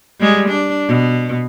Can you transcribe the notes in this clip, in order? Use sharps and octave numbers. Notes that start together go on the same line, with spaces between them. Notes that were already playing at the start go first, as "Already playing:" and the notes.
G3 G#3
D4
B2